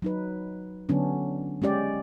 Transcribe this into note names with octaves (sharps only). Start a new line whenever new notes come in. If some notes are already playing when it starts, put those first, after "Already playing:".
F#3 D#4 B4
D3 F#3 B3 C#4 D4
G#3 C#4 G4 D5